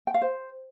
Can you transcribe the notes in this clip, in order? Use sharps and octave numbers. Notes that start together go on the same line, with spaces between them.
G5
F5
C5